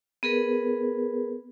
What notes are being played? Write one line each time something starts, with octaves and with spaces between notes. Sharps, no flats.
B3 G#4 A#4 B4